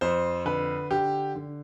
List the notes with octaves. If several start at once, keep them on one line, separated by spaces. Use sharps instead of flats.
F2 C5
D3 B4
D3 G4
D3